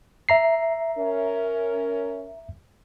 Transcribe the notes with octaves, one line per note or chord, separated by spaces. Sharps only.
E5 A#5 C7
C#4 A#4